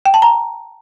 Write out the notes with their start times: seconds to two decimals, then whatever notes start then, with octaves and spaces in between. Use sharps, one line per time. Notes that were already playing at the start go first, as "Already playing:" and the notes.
0.06 G5
0.14 A5
0.22 A#5